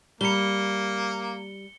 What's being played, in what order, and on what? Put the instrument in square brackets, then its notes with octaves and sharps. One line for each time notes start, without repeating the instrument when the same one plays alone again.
[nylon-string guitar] G3 [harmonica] A#3 [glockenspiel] C#7 G7